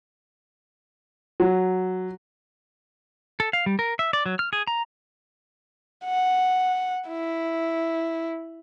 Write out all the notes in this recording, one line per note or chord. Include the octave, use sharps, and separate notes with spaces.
F#3
A4
F5
G3
A#4
E5
D5
F#3
F6
G#4
A#5
F#5
E4